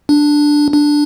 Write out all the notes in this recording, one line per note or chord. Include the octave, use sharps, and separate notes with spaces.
D4
D4